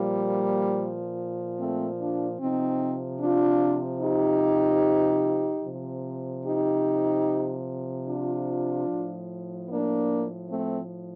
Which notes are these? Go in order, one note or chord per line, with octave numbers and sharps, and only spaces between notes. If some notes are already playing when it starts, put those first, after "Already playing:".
Already playing: A#2 F3 G3 A#3
A3 C4
D4 F4
C3 F3 C4 D#4
D4 F4
D#4 G4
C3 F3
D#4 G4
D4 F4
A2 F3
A#3 D4
A3 C4